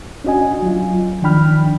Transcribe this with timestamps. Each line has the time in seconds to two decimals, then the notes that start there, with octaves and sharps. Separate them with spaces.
0.24 C#4 D4 F#4 D#5 G#5
0.62 F#3 F4
1.22 D#3 F3 D4 G5 B5 F6